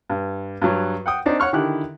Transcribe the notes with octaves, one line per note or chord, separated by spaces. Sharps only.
G2
G2 F#3
F#5 G5 D#6
C4 D4 D#4
C#5 F#5 C#6 F6
D3 D#3 E4 G4 F#6